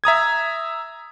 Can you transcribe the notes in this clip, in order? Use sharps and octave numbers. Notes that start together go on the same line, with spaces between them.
E5 A#5 D#6 G#6